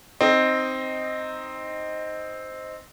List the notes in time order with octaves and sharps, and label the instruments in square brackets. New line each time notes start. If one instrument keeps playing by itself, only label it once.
[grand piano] C4 D#4